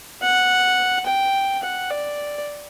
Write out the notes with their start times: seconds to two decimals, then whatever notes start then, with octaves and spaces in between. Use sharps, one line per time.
0.23 F#5
1.06 G5
1.63 F#5
1.90 D5